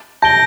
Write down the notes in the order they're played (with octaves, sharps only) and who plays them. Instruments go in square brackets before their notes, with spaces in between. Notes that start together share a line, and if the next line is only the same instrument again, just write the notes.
[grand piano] A5 [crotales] G6 A#6 D7 G7